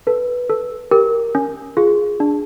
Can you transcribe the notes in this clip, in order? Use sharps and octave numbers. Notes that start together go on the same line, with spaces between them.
A4 B4
A4
G4 A#4
C#4
F4 G#4
D4